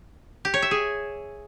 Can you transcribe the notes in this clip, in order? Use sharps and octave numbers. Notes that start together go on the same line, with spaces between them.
G4
C#5
E5
G#4